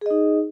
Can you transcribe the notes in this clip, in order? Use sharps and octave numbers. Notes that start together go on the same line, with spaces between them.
D#4 G#4 D#5